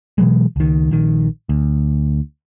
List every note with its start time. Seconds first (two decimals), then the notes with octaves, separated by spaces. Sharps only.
0.18 B2 E3 F#3 G#3
0.56 C#2 D#3
0.91 A#1 D#3
1.49 D2